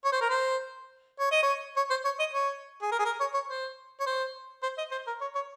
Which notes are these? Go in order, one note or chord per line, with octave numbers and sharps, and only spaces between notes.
C#5
C5
A#4
C5
C#5
D#5
C#5
C#5
C5
C#5
D#5
C#5
G#4
A#4
G#4
A#4
C#5
C#5
C5
C#5
C5
C5
D#5
C5
A#4
C#5
C#5